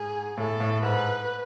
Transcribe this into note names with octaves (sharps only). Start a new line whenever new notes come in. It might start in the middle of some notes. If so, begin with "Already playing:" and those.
Already playing: G#2 G#4
A2 A4
A2
G#2 B4